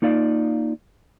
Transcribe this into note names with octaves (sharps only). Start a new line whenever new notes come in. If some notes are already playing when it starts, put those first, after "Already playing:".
A#3 D#4 F4 D5 F5